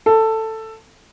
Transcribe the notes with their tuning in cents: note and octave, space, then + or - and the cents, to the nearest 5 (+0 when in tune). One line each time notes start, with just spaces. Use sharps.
A4 +10